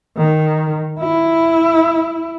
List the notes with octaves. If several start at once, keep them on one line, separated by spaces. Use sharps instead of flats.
D#3
E4